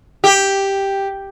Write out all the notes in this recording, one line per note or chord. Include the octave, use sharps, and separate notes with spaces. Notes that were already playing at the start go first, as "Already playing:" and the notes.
G4